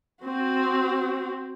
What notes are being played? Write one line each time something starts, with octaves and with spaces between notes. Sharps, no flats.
C4 F#4